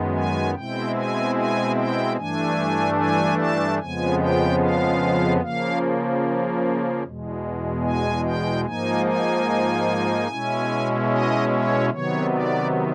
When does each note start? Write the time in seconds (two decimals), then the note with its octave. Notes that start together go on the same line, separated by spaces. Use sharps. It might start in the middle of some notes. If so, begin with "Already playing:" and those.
Already playing: F#2 D#3 G#3 B3
0.14 G#5
0.55 B2 G#3 C4 E4 G5
0.95 G#5
1.35 G#5
1.76 G5
2.16 G2 E3 A3 D4 G#5
2.98 G#5
3.38 A5
3.79 F2 C#3 F3 G#3 B3 G#5
4.19 G5
4.60 F5
5.41 C#3 F3 A#3 F5
7.03 E2 B2 G#3
7.84 G#5
8.24 G5
8.65 G#2 F3 A#3 D#4 G#5
9.06 G#5
10.28 B2 G#3 C#4 E4
11.08 D#5
11.49 C#5
11.90 C3 D#3 F#3 B3 C#5
12.31 D5